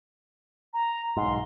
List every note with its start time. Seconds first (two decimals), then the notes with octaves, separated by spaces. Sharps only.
0.74 A#5
1.17 B1 G#2 C6